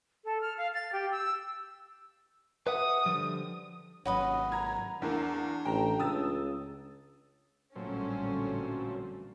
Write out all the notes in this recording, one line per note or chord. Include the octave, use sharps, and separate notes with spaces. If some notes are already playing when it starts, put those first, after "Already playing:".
A4
F6
F5
A6
G4
E6
B4 E5 F#5 D#6
D3 F3 G3
G#1 F#3 C#4 F#4 B4 D#5
A#5 G#6
E2 A#3 D4
A1 G5 A#5
C#2 D#6 E6 A6
A1 A#2 D3 F#3 G3 A3 C4 C#4